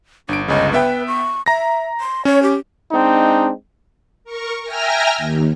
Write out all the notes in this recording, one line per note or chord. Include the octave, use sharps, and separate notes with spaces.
G1 D4 D7
G1 C#2 C#3 D#5
B3 B4 E5 G5
C#6
E5 A#5 A#6
C6
C#4 C#5
G4
G#3 C4 D4 D#4
A#4 C#6
E5 G5 G#5 A#5 F6 A#6
D#2